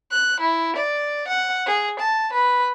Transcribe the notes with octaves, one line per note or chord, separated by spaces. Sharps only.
F#6
E4
D5
F#5
G#4
A5
B4